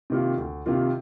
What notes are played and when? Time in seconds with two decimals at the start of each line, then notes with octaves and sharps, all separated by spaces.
0.10 C3 D#3 A#3 F4
0.38 D2
0.66 C3 D#3 A#3 F4